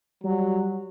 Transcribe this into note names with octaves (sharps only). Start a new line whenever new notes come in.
F#3 G3